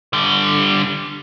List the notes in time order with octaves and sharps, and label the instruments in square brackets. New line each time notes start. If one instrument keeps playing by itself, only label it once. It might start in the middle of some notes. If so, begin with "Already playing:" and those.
[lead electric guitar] D3 G3